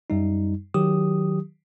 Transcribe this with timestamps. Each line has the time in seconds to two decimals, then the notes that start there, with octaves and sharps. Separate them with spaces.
0.10 F#2 G3 D#4
0.74 D#3 F#3 G4 D#6